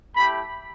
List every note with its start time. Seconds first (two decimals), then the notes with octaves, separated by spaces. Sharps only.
0.15 A3 E4 G4 B5